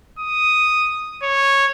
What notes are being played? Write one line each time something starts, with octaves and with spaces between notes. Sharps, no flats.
D#6
C#5